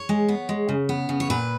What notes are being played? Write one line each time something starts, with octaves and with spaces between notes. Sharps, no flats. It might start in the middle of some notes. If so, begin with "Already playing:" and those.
Already playing: C#5
G#3
B3
G#3
C#3
B3
C#3
C#5
A#2 B4